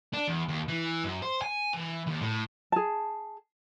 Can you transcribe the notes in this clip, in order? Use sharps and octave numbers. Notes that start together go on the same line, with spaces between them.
D4
E2
D#2
E3
F#2
C5
G#5
E3
D#2
A2
G#4 A5